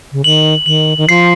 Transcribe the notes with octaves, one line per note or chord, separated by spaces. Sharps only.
C#3
D#3 F#7
D#3 F#7
D#3
F3 C7